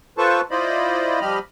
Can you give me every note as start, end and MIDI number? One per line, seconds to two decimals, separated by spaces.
0.18 0.41 65
0.18 0.41 69
0.18 0.41 71
0.18 0.41 72
0.18 0.41 81
0.18 0.41 85
0.51 1.20 64
0.51 1.20 65
0.51 1.20 72
0.51 1.20 74
0.51 1.20 75
0.51 1.20 83
1.21 1.39 53
1.21 1.39 55
1.21 1.39 67
1.21 1.39 75
1.21 1.39 83
1.21 1.39 89